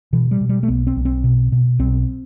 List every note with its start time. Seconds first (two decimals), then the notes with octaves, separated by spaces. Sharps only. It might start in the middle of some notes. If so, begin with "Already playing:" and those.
0.13 B2 E3
0.31 G3
0.41 B2
0.49 G3
0.63 A3
0.68 B1 B3
0.87 C4
0.96 B1
1.05 C4
1.24 B2
1.52 B2
1.79 B1 C4